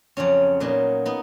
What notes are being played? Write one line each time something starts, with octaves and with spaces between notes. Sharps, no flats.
F2 C#3 F#3 C#4
A#2 F#3 B3 D#4
B3 D#4